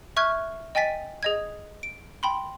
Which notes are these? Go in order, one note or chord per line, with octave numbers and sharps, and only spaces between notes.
E5 C#6 F6 F#6 G#6
D#5 G5 G#5 A6 B6
G#4 D#5 G#6
D7
G5 B5 C6